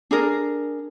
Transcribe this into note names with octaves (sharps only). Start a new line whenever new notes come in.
D4 G#4 A#4